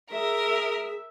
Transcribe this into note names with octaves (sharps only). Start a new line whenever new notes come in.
G#4 A#4 E5